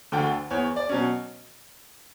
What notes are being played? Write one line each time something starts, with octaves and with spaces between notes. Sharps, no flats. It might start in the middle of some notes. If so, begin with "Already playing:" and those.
D2 D3 G5
E2 C#5
D5
B2 F#3 C#4